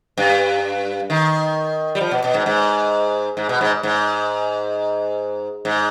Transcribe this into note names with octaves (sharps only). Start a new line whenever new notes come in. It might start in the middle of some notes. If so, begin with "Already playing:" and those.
G2
D#3
G3
F3
B2
B2
G#2
G#2
G#2
B2
G#2
G#2
G#2